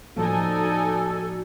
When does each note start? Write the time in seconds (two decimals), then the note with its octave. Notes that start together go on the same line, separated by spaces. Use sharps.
0.17 A2 F3 A#3 D#4 F#4 A4 D5 G#5